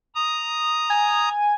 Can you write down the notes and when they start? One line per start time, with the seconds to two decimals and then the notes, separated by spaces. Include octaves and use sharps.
0.15 A#5 D#6
0.90 G#5